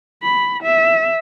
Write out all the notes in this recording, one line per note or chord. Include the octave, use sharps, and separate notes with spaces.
B5
E5